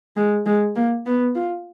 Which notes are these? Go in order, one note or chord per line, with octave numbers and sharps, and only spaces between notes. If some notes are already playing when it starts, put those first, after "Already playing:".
G#3
G#3
A#3
B3
F4